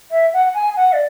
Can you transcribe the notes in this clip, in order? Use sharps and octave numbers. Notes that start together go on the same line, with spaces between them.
E5
F#5
G#5
F#5
D5